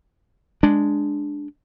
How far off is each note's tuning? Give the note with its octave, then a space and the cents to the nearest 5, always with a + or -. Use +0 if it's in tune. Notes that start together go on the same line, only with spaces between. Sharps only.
G#3 +0 D4 +0